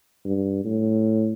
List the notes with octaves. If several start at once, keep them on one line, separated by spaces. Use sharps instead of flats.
G2
A2